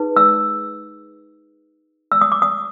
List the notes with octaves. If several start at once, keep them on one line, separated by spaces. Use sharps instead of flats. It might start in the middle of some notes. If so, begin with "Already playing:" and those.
Already playing: D#4 G#4 B4
E6
E6
D#6
D6
D#6